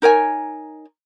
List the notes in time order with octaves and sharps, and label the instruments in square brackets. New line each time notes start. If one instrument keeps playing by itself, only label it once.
[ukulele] D#4 A#4 C#5 G#5